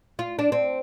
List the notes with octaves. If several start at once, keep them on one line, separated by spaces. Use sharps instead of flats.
F4
D4
C4